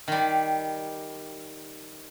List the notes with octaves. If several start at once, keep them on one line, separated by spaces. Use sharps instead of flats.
D#3 G3